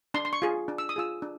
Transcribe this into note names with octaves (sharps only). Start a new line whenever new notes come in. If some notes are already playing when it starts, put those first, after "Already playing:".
D4 C6
C6
C#6
F4 G#4
D4
E6
D#6
F4 G#4 E6
D4